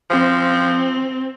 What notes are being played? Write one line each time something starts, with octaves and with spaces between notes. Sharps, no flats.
F3 C4